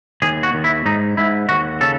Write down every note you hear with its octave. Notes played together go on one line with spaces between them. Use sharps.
D#2 G#4
F#4
D#2
E4
G#2 D#4
G#2 E4
D#2 F#4
C#3 A4